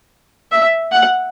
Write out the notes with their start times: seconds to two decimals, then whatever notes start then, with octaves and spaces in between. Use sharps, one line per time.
0.51 E5
0.92 F#5